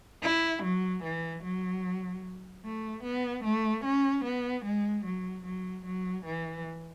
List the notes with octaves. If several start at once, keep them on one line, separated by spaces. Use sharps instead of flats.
E4
F#3
E3
F#3
A3
B3
A3
C#4
B3
G#3
F#3
F#3
F#3
E3